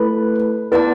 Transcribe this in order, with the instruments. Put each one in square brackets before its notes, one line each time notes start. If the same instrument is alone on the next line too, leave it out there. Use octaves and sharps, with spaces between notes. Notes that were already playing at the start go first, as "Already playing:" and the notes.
Already playing: [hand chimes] A3 E4 A4 [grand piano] B4
[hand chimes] B3 E4 D5 F#5 A5 [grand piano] B4